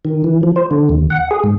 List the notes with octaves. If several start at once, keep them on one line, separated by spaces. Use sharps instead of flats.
D#3
E3
F3
C5
D3
D#2
F#5
G#4
G#2